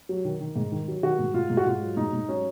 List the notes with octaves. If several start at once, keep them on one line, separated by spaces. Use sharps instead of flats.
F#3
D#3
D#3
G#2
D#3
F#3
D#3 F#4
G#2
G#2 F4
G#2
F#4
G#2 F4
F#3
G#2 D#4
G#2
F#3 C#4